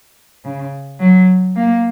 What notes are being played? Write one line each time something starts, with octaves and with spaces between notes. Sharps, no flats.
C#3
F#3
A#3